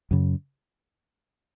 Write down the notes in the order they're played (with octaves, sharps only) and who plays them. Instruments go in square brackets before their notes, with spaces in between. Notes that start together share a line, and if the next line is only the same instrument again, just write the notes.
[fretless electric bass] F#2 C#3